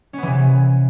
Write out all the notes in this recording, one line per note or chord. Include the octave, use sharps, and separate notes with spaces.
C3 E3 B3 C#4